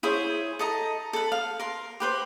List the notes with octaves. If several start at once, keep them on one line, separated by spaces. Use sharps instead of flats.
E4 G#4 C5 C#5
A4 D#5 A#5
A4 B4
F5
A#4 C6
G4 B4 C5